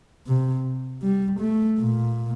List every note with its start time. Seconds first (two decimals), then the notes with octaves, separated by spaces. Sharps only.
0.27 C3
1.02 G3
1.40 A3
1.78 A#2